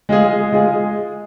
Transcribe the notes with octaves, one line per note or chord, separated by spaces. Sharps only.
G#3 F4 G#4
G#3 F4 G#4